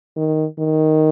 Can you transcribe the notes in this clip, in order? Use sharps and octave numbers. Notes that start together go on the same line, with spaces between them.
D#3
D#3